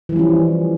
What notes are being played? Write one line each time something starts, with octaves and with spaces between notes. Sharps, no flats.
E3 F3 G3 C#4